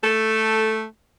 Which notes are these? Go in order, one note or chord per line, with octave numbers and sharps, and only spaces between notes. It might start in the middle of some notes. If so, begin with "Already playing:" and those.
A3 A4